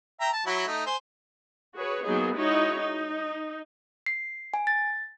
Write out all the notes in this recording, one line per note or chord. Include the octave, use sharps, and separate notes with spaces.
E5 G5 A#5
A5
F#3 E4 F#4
A3 D#4
C5 G#5
F#4 G#4 B4 C#5
F#3 A#3 B3 D#4 G#4
G#3 D#4 E4 F#4 C#5
D#4
C7
G#5
A6